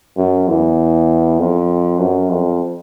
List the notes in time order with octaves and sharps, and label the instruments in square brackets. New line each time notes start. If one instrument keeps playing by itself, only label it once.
[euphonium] F#2
E2
F2
F#2
F2